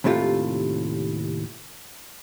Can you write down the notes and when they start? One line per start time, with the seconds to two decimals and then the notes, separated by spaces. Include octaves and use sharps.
0.04 D#2 A2 C3 A3 F4